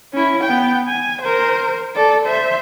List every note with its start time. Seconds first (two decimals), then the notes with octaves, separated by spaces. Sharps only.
0.13 C#4 E4
0.44 B3 G5
0.88 G#5
1.22 A#4 C5
1.95 A4 D5
2.26 C5 E5